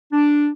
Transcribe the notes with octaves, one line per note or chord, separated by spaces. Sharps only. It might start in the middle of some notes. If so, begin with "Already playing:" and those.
D4